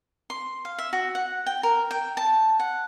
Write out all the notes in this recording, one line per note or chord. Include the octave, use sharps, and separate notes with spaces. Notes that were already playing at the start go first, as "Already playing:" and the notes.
C6
F5
E5
F#4
F#5
G5
A#4
G5
A5
F#5